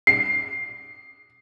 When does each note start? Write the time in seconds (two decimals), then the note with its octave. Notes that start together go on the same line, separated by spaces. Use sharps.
0.07 C7